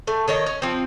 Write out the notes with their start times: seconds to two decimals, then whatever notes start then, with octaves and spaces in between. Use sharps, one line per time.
0.07 A3
0.28 D#3 C#5 D#5
0.46 C#4
0.62 F3 C4